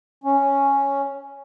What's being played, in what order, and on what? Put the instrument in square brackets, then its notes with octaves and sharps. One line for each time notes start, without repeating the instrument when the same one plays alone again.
[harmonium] C#4